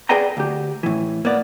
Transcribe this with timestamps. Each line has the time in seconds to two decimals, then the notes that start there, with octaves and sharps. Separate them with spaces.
0.09 G#4 B4 D5 G5 G#5 A#5
0.37 D2 G4
0.83 A2 E3
1.25 A#3 B3 D5